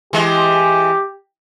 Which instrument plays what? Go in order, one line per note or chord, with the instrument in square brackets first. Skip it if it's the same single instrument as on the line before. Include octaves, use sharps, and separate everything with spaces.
[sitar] E3 G#3 [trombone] G4